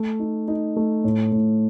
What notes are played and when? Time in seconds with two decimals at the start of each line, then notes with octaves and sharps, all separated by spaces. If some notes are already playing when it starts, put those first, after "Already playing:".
Already playing: A3
0.19 D#4
0.48 D#4
0.76 A3
1.04 A2
1.32 A2